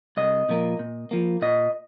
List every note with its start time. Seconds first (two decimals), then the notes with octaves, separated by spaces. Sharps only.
0.17 C2 D#5
0.49 A#2 F3 A#3
0.79 A#2
1.11 F3 A#3
1.42 A#2 D#5